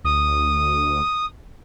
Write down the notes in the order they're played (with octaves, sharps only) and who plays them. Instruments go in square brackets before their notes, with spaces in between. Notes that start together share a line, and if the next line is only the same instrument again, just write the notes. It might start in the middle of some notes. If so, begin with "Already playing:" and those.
[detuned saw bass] D2 [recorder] D#6